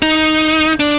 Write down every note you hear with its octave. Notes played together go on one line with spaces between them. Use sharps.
D#4
D4